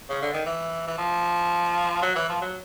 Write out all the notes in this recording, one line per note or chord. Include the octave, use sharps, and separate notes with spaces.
C#3
D3
D#3
E3
E3
F3
F#3
E3
F3
F#3